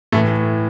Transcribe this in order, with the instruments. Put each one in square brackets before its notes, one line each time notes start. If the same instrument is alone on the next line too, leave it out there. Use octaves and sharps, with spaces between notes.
[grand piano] A2 E3 A3